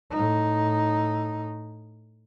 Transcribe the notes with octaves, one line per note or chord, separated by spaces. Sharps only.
A2 D#4